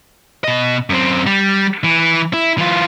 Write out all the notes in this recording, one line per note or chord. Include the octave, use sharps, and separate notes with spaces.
B2 D#5
F#2 C4
G3
E3
E4
E3 F4